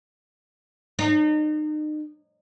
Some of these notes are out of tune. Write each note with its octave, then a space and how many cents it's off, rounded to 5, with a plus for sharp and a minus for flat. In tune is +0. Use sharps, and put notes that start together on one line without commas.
D#4 -35